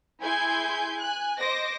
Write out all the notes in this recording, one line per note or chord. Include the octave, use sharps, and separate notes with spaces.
E4 G#4 G#5 C6 G6 G#6
G#5 F#6
C5 D#5 D6 A#6